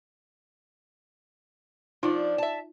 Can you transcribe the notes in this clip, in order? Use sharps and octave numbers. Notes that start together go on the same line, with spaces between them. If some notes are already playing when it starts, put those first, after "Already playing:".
F3 D4 D#4 F4 D5
E5 A5